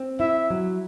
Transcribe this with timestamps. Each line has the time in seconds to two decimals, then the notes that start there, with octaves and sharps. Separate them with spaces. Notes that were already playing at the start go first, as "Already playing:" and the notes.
Already playing: C4
0.20 E4 E5
0.50 F#3